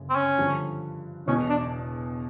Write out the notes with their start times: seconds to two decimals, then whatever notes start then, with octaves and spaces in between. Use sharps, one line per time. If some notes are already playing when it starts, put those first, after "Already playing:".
Already playing: G1 F#2 C#3
0.10 C4
0.15 C#4
0.38 G2 D3 F3
1.27 E1 E2 B2 C#4
1.49 D4